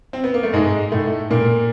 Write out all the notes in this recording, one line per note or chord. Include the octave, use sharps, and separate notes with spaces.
C4
B3
A#3
A3
G#2 G#3
A2 A3
A#2 A#3